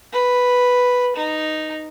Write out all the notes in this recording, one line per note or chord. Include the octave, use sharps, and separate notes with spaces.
B4
D#4